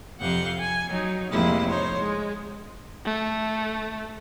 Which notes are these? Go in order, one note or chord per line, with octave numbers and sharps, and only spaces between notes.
F2 C3 F5 F#5 G6
G#5
F#3 D#4
F2 A2 C3 G#3 A#3 E4
D#4 C5 C#5
G#3
A3